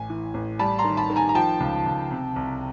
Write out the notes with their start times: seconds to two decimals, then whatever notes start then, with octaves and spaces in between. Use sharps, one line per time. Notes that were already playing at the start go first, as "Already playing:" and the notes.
Already playing: A1 G#5
0.10 E3
0.34 A1
0.59 G3 A5 B5
0.78 A#5 C6
0.84 D#3
0.97 A5 B5
1.10 D#3
1.16 G#5 A#5
1.29 A#5
1.35 F3 G5 A5
1.60 C#2
1.85 C#2
2.11 C3
2.36 C2